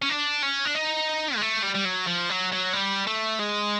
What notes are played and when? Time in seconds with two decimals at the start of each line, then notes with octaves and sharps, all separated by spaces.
0.02 C#4
0.10 D4
0.43 C#4
0.65 D4
0.75 D#4
1.36 G#3
1.42 A3
1.63 G3
1.75 G3
1.85 F#3
2.07 F3
2.30 F#3
2.52 F#3
2.73 G3
3.07 A3
3.39 G#3